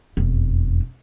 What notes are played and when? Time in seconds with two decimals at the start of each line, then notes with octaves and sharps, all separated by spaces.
0.17 E1 F2